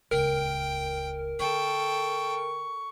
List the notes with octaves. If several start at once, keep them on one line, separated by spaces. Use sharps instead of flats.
D#1 C#2 A#4 G5
D3 A4 G5 C#6